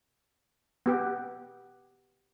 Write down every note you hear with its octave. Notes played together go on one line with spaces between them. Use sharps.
B3 G4